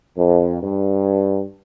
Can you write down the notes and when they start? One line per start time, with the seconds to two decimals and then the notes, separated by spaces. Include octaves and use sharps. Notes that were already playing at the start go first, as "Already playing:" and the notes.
0.17 F2
0.61 G2